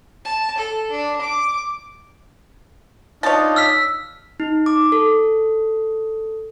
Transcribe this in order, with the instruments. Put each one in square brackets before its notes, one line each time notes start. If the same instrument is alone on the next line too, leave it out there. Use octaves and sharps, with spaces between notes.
[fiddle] A5
A4
D4
D6
[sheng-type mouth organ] D4 D#4 F4 [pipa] C#5 A5
[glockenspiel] E6 F6 B6
[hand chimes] D#4
D6
A4